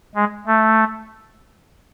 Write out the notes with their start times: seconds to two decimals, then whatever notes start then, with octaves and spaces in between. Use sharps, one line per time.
0.15 G#3
0.47 A3